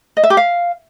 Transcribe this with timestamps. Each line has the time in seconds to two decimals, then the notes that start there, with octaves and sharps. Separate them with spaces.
0.17 D#5
0.23 E5
0.30 G4
0.37 F5